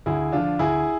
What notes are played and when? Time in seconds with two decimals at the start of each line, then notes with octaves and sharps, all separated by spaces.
0.06 D2 E4 G#4
0.32 D3 F3 D4 F4
0.59 D2 E4 G#4